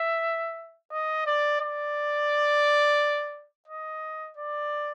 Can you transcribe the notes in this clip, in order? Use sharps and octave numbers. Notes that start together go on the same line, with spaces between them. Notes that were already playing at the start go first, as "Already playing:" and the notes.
Already playing: E5
D#5
D5
D5
D#5
D5